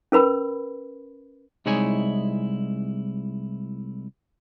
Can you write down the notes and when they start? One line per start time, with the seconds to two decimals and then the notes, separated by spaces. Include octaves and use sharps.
0.12 C#4 A#4 B4 B5
1.66 C2 G#3 D#4 E4 C#5 G#5